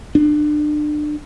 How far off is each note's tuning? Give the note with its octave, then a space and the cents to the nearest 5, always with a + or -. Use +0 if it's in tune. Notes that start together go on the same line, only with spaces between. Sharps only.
D4 +30